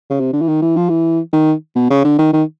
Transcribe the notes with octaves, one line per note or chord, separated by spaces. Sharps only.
C#3
C3
D3
E3
D#3
E3
F3
E3
D#3
B2
C#3
D3
D#3
D#3